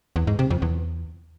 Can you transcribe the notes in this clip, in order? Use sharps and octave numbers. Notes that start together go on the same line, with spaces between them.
E2
G#2
C3
F2
E2